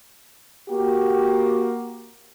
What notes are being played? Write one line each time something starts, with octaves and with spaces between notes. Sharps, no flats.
A#3 F#4 G4